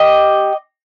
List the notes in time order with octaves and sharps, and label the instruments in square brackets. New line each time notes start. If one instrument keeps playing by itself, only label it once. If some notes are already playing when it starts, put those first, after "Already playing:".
Already playing: [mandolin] G4 D#5